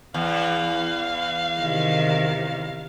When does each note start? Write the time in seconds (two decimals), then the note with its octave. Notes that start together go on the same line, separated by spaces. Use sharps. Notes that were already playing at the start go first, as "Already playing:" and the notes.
0.14 E2 F5
1.60 C3 D#3